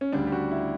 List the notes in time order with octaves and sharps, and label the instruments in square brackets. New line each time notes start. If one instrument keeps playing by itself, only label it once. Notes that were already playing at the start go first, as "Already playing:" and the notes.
[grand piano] C#4
D2 C#3 G3 D4
G4
F#4
E4